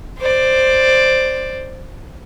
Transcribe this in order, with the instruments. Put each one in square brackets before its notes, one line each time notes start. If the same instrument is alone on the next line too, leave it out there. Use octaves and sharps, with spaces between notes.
[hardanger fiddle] C5 D5